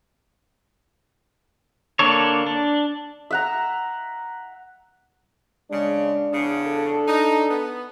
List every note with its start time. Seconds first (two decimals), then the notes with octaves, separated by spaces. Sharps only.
1.99 D3 A#3 D4 A4 C#5
2.46 D4
3.31 E5 F#5 A#5
5.71 C#3 G#3 D4
6.32 E2 C#3 D4
6.67 A4
7.07 D#4
7.50 B3